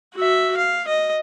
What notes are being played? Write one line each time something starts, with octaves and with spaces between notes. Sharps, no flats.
F#4 E5
F5
D#5